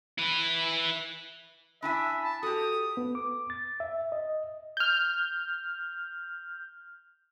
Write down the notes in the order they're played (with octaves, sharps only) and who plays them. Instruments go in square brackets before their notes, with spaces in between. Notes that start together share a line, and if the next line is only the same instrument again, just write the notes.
[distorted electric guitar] E4 B4
[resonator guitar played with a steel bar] D4 E4 G#5 [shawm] E5 [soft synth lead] B5
[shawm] A5
[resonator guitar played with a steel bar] F#4 G4 [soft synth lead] A4 [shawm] D#6
[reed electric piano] B3
D6
A6
E5
D#5
[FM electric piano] F6 G6